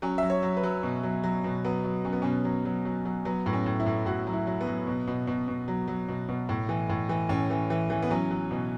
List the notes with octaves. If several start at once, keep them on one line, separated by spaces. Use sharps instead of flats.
F#3 C#4
F#3 E5
C#5
F#3
B4
F#3
B2
F#3
F#3
B2
F#3 B3
F#3
F#3 C#4
B3
B2 C#4
F#3
F#3
F#3
F#3
F#3 B3
A2
C#4
A2
E4
A2
A2 F#4
F#3
E4
F#3
B3
F#3
B2
B2
B2
B2
F#3
F#3
B2
B2
A2
E3
A2
E3
A2 C#4
E3
E3
E3
B3
F#3 C#4
F#3
B2